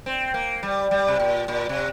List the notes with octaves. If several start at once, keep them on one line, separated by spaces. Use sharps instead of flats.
C4
A#3
G3
G3
C3
A#2
A#2
C3